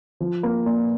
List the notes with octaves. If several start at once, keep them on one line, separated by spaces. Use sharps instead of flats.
F3
A#3
A#2